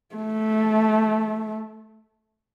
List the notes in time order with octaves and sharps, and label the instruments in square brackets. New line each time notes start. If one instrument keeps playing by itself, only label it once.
[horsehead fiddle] A3